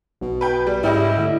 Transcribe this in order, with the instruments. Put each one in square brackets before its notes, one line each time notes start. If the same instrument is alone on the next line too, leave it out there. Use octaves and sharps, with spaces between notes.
[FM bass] B1 [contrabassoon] B2
[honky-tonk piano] B4 G5
G3
[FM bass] G#2 [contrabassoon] C#3 [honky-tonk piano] G3 G4 D#5 [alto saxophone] E4
[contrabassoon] A2 [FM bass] D3